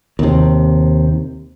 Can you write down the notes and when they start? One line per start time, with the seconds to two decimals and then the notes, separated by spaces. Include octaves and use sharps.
0.19 D#2 C3